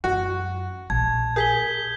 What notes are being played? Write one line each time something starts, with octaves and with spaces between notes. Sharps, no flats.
F#2 F#4
A#1 A5 G#6
G#4 A#4 G6 B6 G7